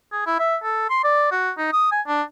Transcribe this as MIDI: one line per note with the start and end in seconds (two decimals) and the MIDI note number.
0.12 0.24 68
0.26 0.37 64
0.39 0.56 76
0.63 0.88 69
0.89 0.99 84
1.04 1.28 74
1.31 1.51 66
1.58 1.69 63
1.72 1.88 87
1.91 2.01 80
2.07 2.22 62